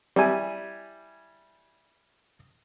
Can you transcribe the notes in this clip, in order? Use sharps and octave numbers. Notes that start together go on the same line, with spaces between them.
G3 E4 G#5